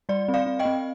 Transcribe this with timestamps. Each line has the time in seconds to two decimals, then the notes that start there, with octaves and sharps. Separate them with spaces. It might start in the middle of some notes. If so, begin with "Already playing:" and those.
0.09 G3 D5
0.28 C4
0.34 D5 F5
0.46 C4
0.59 D#5 G5
0.65 C4